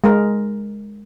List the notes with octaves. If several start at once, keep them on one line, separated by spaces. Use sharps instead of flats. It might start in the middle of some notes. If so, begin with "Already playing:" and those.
G#3 A#4